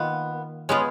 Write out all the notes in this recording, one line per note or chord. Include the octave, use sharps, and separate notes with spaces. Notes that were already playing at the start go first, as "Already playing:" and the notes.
Already playing: D#3 A#3 B3 F4
G#3 B3 C#4 F4 G#4